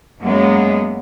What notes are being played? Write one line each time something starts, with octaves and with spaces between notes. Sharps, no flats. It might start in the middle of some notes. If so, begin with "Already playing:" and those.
F#2 F#3 G#3 A#3 B3